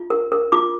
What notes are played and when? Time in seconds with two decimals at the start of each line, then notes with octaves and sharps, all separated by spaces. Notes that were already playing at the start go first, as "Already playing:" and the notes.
Already playing: F4
0.10 A#4
0.32 A#4
0.52 F4 D6